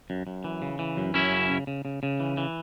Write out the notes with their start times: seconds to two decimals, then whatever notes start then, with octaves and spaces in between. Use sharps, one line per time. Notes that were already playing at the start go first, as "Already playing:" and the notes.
0.10 F#2
0.27 F#2
0.44 E3
0.62 C#3
0.79 E3
0.97 F#2
1.14 F#2 C#4 E4
1.32 C#3
1.50 C#3
1.67 C#3
1.85 C#3
2.03 C#3
2.20 E3
2.37 E3